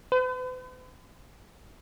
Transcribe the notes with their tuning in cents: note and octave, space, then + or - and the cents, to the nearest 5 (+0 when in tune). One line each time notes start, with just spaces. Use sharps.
B4 +45